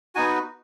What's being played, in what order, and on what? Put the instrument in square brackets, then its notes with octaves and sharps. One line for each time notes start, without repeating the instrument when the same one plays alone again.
[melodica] B3 D#4 F#4 G#5